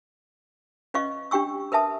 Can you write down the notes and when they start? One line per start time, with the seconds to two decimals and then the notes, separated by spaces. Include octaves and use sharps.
0.94 C#4 B4 D#5 F5 C#6
1.31 D4 G4 G5 C#6 E6
1.72 A#4 B4 E5 A5 D#6